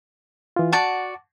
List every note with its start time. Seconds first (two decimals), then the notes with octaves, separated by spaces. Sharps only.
0.56 E3 F4
0.73 F#4 D5 F#5 A5